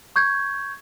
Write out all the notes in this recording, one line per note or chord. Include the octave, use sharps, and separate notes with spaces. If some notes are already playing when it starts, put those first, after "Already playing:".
C#6 G6 G#6